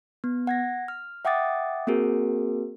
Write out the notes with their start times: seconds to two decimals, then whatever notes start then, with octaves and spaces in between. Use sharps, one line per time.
0.24 B3
0.47 F#5 G#6 A#6
0.88 F6
1.25 E5 F#5 G5 D6 D#6 A6
1.87 A#3 C4 F#4 G#4 A#4